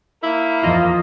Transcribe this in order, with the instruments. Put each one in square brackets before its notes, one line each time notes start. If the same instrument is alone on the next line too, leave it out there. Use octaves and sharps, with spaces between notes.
[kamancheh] A#3 [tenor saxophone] E4
[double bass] E2 F3 [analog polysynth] F4 D#5